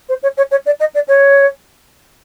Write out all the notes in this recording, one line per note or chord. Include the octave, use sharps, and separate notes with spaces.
C5
C#5
C#5
C#5
D5
D#5
D5
C#5